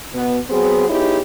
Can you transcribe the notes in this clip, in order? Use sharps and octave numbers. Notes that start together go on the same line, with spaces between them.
B2 B3
F#3 B3 C4 G#4
B3 D#4 E4 G4 G#4 C#5